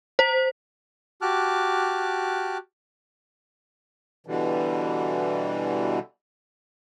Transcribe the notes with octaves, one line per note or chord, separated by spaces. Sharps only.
C5
F#4 G4 A5 D6 F6 F#6
B2 D3 E3 G3